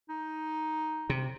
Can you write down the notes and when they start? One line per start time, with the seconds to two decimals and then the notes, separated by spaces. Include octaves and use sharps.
0.09 D#4
1.10 C3